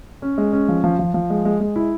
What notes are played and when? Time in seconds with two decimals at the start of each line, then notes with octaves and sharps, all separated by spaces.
0.22 C#4
0.38 G#3
0.53 C#4
0.68 F3
0.84 F3
0.99 F3
1.14 F3
1.30 G#3
1.45 G#3
1.60 G#3
1.76 E4